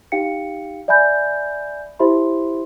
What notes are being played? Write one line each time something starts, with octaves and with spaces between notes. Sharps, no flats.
D#4 G4 F5 G5 C#7
D5 E5 G#5 B5 G6
E4 G4 C5 E5 B5 C6